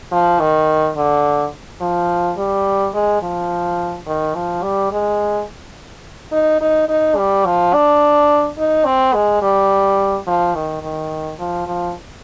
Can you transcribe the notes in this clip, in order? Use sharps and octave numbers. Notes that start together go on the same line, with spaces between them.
F3
D#3
D3
F3
G3
G#3
F3
D#3
F3
G3
G#3
D#4
D#4
D#4
G3
F3
D4
D#4
C4
G#3
G3
F3
D#3
D#3
F3
F3